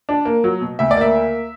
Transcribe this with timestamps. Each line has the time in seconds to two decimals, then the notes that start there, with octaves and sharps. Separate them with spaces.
0.09 D4
0.25 A#3
0.44 F#3
0.61 B2
0.79 D2 E5
0.91 D5
0.97 A#3 E5